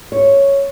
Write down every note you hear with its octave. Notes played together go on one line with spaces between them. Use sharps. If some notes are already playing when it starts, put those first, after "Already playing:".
C#5